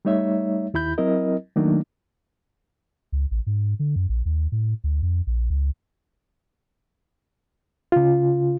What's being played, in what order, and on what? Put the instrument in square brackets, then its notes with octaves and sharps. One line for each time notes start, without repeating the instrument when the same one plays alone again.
[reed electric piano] G3 A3 D#4 C#5 E5
D#2 E4 B5 G6
F#3 C4 E4 A#4 D#5
D#3 F#3 A3 A#3 D4 D#4
[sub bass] C#2
A1
G#2
D3
F#2
A#1
D#2
A2
D2
F2
A#1
C#2
[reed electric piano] C#3 F4